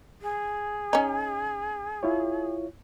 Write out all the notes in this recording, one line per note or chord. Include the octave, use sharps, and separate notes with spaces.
G#4
C#4 D#4
E4 F4 C#5